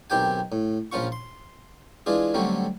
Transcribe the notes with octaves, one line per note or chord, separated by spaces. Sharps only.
B1 D#3 C4 G4 G5 G#5
A2
A#1 F3 C#4 F4 C#6
C6
E3 G#3 D4 F4 G#4
D3 F#3 G3 A3 C4 C#4